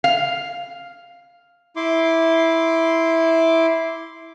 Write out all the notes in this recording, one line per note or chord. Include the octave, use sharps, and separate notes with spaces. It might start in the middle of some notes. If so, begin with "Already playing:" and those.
F5
E4 C6 D6